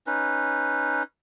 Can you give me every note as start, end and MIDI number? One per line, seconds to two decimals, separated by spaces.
0.07 1.03 61
0.07 1.03 63
0.07 1.03 71